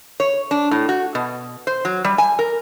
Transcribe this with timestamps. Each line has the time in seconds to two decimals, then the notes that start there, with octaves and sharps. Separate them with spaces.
0.20 C#5
0.51 D4
0.71 A2
0.89 F#4
1.15 B2
1.67 C5
1.85 F#3
2.04 G3
2.18 G#5
2.39 A#4